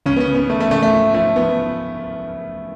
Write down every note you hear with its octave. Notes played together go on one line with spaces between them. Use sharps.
C#2 C#4
B3
C#4
C#3
B3
C#3 A3
A3
C#3 A3
A3
F3
F3 A3
F3 B3